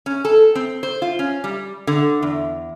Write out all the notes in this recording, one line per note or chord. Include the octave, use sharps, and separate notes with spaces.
C#4
A4
C4
C5
F4
C#4
G3
D3
E2